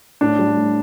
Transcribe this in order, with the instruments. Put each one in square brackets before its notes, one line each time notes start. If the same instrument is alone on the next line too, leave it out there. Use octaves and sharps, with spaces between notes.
[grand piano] A2 D4
G3
A2